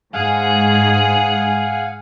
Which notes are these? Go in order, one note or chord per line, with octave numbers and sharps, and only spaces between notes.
G#2 G#4 F5 F#5 G#5